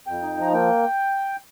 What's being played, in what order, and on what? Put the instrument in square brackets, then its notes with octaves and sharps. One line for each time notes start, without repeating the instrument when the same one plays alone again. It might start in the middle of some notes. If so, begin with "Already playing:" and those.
[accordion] F2 G5
D#4
F3 A#5
A#3 G5